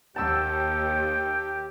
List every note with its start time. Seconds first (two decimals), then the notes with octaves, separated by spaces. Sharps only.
0.16 D#2 G4 G5 A5 E6